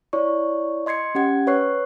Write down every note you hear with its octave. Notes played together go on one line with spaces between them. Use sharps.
E4 C#5 D5 C#6
D#5 C6 G#6 C7 C#7
C#4 G4 F#5 G#6
B4 C#5 C#6 F#6 C7